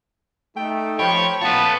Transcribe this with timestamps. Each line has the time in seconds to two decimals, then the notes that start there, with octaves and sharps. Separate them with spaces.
0.57 A3 D#4 G5
0.99 F3 C#5 G5 B5
1.42 A1 B3 F4 B4 C#5 A5